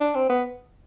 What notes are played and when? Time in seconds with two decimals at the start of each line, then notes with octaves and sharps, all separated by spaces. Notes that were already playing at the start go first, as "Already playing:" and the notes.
0.01 D4
0.15 C4
0.29 B3